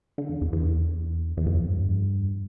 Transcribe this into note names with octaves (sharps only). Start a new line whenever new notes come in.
D3
E2
E2
E2
E2
F2
G2